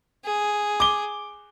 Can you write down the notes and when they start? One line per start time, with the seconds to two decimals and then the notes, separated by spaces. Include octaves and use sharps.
0.25 G#4
0.80 D6 G7